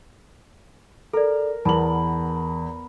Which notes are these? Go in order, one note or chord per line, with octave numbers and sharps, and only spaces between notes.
A4 A#4 D5
E2 B3 A#4 A5 B5 F#7